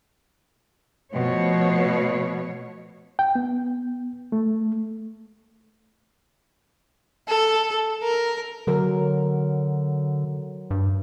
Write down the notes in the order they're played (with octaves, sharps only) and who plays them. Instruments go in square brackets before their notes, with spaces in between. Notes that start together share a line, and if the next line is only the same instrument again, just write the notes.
[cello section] B2 F3 A3 C#5
[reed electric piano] G5
B3
A3
[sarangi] A4
A#4
[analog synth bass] D3 [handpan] F#3 A#4
[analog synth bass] G2